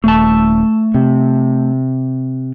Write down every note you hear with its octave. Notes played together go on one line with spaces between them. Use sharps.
D#1 A3 A5
C3